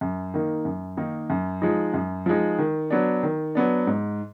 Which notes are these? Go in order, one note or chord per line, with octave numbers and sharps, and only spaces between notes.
F#2
D#3 A#3 D#4
F#2
D#3 A#3 D#4
F#2
F3 G#3 D#4
F#2
F3 G#3 D#4
D#3
F#3 B3 D4
D#3
F#3 B3 D4
G#2